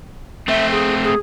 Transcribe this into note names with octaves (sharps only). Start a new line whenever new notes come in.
A3 C4 E5
G#4
G#4